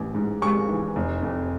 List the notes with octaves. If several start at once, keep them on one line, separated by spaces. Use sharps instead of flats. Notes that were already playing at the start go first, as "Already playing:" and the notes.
Already playing: A1 E3
G#2
G#3 C#6
E3
F1
F2